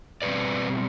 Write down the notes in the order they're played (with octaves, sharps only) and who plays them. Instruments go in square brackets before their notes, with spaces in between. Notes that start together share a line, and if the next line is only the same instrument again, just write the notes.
[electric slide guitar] B2 G3 C4 B4 D5